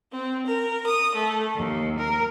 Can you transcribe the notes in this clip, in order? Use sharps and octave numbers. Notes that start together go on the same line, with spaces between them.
C4
A#4
D#6
A3
D#2
A#4